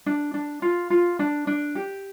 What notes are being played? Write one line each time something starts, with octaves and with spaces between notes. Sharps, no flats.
D4
D4
F4
F4
D4
D4
G4